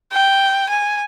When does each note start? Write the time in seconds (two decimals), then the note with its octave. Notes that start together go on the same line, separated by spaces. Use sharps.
0.12 G5
0.70 G#5